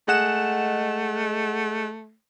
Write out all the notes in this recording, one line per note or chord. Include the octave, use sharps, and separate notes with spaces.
G#3 A3 F#5 E7